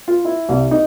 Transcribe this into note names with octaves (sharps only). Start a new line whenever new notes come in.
F4
E4
C2
D#4